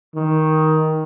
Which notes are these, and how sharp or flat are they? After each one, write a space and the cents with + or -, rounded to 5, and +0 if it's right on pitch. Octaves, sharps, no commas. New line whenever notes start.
D#3 +10